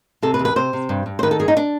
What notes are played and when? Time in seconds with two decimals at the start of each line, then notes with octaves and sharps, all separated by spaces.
0.22 C3 A4
0.34 B4
0.39 E2
0.45 B4
0.56 C3 C5
0.73 C3
0.89 G2
1.06 G2
1.19 C5
1.23 D#3 B4
1.31 A4
1.39 G2 G#4
1.48 D#4
1.57 D4